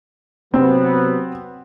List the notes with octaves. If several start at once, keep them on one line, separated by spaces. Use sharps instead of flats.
C3 F#3 B3 C4